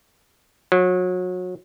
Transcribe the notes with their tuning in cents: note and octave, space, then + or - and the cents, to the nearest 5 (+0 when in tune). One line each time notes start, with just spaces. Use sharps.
F#3 -30